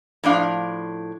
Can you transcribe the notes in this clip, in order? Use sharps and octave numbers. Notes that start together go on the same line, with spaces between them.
A2 F3 D4 F5